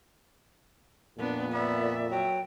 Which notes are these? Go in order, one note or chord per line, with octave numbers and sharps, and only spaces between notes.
F2 A#2 B3 D4
B3 D5 E5
F#3 G5